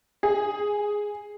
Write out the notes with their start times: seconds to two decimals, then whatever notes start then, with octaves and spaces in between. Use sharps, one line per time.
0.23 G#4